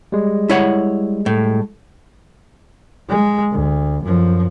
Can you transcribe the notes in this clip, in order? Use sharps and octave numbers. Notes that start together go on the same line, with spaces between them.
G3 G#3
E4 C#5 F#5
A2
G#3
D2
F#2 F3